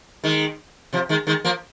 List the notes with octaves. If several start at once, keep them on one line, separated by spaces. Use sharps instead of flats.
D#3 G#3
C3 F3
D#3 G#3
D#3 G#3
F3 A#3